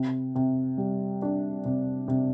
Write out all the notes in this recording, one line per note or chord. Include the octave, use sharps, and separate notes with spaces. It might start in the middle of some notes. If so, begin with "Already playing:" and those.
Already playing: C3
C3
G3
D4
C3
C3